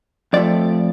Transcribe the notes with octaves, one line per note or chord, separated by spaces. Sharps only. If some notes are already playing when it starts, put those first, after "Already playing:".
F2 F3 A3 D5